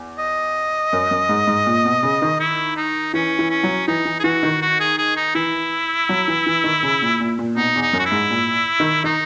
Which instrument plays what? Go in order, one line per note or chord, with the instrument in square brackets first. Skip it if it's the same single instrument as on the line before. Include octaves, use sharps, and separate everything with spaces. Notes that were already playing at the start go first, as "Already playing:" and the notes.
Already playing: [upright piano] E2
[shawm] D#5
[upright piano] F#2
F#2
G#2
G#2
A#2
B2
C#3
D#3
[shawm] E4
D#4
[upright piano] E3 [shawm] C#4
[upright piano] E3
[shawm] C#4
[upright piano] F#3
[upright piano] E3 [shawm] D#4
[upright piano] E3
[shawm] G#4
[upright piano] E3 [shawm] F#4
[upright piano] D#3
[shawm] F#4
G#4
G#4
D#4
[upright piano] E3 [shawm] E4
[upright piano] F#3
E3
E3
D#3
C#3
A#2
A#2
A#2
[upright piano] B2 [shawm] D#4
[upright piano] E2
[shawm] D#4
[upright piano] F#2
[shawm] F#4
E4
[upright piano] G#2
A#2
D#3
[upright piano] D#3 [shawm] D#4